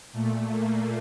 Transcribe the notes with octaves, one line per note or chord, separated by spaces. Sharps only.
A#2 A3
A#3